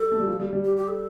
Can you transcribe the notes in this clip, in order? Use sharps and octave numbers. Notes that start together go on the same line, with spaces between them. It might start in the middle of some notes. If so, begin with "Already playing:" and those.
Already playing: G3 A4
A3
G3
F3
G3
G3
G4
G4
A4